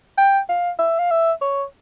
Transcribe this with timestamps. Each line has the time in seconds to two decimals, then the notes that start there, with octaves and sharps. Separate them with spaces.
0.18 G5
0.49 F5
0.79 E5
0.99 F5
1.11 E5
1.42 C#5